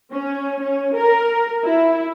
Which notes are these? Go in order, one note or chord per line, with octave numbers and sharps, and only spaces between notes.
C#4
C#4
A#4
E4